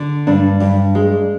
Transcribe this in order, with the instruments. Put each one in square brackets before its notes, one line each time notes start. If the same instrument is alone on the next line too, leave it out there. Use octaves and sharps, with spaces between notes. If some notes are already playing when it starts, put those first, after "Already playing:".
Already playing: [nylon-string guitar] D3
G2 D4
G2
G#3